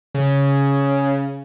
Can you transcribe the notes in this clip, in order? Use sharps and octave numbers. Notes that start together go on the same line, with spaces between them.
C#3